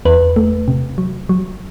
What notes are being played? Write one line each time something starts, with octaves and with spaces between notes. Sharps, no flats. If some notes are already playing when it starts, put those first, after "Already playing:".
E2 B4
A3
C3
F#3
F#3